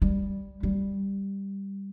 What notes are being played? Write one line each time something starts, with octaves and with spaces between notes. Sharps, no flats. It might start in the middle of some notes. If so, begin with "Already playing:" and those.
G3
G3